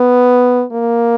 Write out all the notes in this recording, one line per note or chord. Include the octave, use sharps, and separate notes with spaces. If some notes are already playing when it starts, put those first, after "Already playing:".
Already playing: B3
A#3